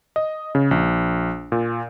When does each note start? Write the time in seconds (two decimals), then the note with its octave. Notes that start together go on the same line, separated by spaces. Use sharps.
0.16 D#5
0.55 C#3
0.71 A#1
1.52 A#2